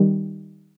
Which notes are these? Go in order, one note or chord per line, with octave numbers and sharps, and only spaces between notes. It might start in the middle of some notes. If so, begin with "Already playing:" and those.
Already playing: D#3 G3